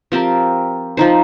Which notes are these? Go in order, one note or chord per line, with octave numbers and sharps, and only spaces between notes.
F3 C4 G4 A#4
F3 D#4 C5